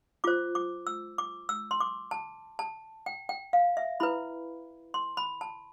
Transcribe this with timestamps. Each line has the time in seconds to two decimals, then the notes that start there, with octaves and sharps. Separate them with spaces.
0.24 F4 C5 D6
0.55 D6
0.87 E6
1.18 D6
1.49 E6
1.71 C6
1.80 D6
2.11 A5
2.59 A5
3.06 G5
3.29 G5
3.53 F5
3.77 E5
4.00 E4 B4 B5
4.94 C6
5.17 B5
5.41 A5